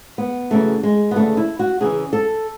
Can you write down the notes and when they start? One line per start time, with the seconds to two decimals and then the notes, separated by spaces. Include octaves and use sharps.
0.18 B3
0.50 F#2 C#3 E3 A3
0.83 G#3
1.11 B3
1.16 D2 C#3 E3 A3
1.37 E4
1.59 F#4
1.80 E2 C#3 E3 G#4
2.13 A4